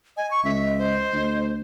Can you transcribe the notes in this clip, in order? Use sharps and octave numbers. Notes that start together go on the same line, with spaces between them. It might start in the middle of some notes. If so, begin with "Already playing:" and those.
D#5 G#5
C#6
C#2 E5
C5
D2